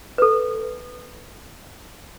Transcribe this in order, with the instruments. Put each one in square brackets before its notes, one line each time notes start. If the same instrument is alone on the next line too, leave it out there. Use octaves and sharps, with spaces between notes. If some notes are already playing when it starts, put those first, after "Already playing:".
[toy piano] A4 B4